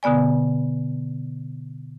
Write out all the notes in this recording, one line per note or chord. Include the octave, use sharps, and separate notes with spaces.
B2 D3 B3 D5 G#5